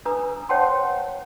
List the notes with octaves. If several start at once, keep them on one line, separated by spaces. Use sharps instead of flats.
D4 B4 A#5 D#6
C5 C#5 F#5 G5 A5 C6